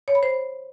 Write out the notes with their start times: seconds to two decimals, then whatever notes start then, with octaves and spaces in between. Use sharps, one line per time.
0.08 C#5
0.15 B5
0.23 C5